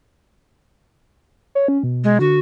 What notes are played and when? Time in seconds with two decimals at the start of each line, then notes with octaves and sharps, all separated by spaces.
1.55 C#5
1.68 C#4
1.83 B2
2.04 G#3
2.20 D3 F#4